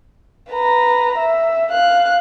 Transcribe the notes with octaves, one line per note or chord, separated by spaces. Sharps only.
B4 A#5
E5
F5 F#6